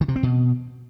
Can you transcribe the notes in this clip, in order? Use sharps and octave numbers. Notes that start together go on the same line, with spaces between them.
D#3
C3
C4
B2